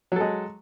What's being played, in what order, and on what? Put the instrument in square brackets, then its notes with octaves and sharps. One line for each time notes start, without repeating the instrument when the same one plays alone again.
[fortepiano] F#3
A4
G#3